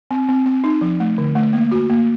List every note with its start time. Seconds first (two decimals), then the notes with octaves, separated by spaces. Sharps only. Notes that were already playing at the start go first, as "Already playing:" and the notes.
0.11 C4
0.29 C4
0.46 C4
0.64 D#4
0.81 F3
1.00 A3
1.18 D3
1.35 A3
1.53 A#3
1.71 F#4
1.90 A#3